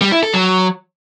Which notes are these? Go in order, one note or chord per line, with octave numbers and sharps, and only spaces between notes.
G3
E4
A4
F#3